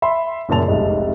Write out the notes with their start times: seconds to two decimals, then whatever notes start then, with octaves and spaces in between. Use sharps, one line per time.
0.02 E5 B5 C6
0.49 F#1 F#2 A#2 C#3 A5 F7
0.67 F1 C2 G#3 D#4